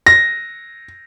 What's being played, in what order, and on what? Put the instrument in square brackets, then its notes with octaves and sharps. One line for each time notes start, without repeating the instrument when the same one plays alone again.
[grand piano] A#6